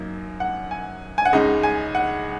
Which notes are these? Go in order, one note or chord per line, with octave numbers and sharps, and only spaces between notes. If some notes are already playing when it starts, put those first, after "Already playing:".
Already playing: F#2 F#3 A#3 D#4
F#5
G#5
G#5
F#5
C#2 C#3 G#3 D#4 D#5
G#5
F#5